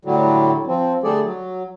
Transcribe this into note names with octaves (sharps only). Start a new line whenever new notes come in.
A2 D3 F#3 G3
F3 C4
D3 G3 A3 G#4 A4 D5
F#3